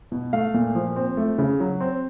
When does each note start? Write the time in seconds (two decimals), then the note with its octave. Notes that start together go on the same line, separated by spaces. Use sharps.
0.12 B2
0.33 A3 F5
0.54 A#2
0.75 F3
0.96 C4
1.17 A3
1.38 C#3
1.60 F#3
1.80 C4